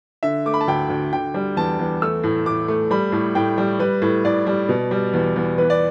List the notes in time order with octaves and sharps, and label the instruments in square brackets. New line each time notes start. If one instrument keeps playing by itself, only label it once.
[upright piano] D3 E5
A3 D6
B5
A5
D2 G5
D2
D3 G5
G3
E2 A5
E2
A3 E6
A2
A2 D6
A3
G3 B5
A2
A2 G5
G3
G3 B4
A2
A2 D5
G3
B2
G3
E2
E2
E3 B4
D5